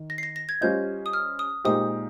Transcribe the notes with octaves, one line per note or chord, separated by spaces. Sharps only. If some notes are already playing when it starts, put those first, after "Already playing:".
Already playing: D#3
A#6
C7
A#6
A#6
G#6
G3 C#4 F4 C5 D#5 G6
D#6
F6
D#6
A#2 G#3 D#4 G4 C5 D#6